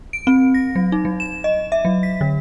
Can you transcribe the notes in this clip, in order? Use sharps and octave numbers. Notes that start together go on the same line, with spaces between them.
D7
C4
A#6
F#3
D#4
F#3
E7
D#5
E5
F#3
B6
D3